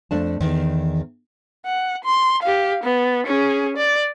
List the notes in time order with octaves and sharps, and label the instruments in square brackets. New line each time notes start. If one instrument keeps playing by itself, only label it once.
[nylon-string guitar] F2 A3 D4 A5
E2 D#3
[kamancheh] F#5
C6
G4 F5
B3
C#4 G#4
D5